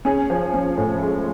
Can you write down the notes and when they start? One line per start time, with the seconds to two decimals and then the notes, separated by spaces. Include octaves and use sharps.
0.05 C#4 G#4
0.30 F3
0.54 C#4
0.78 A2
1.03 G#3